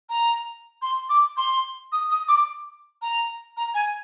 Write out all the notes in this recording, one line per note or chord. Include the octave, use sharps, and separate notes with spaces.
A#5
C6
D6
C6
D#6
D#6
D6
A#5
A#5
G#5